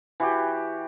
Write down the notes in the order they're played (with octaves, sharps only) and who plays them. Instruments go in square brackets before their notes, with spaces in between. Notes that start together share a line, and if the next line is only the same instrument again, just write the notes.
[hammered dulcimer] E3 F#4 G4